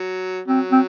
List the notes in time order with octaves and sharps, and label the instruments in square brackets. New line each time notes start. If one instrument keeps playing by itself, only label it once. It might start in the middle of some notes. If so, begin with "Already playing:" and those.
Already playing: [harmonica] F#3
[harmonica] F#3 [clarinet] C4
[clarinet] C4